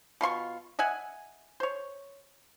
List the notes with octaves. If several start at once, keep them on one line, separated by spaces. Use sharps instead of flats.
B2 F4 C6 C#6
D#5 E5 F#5 G#5
C5 C#5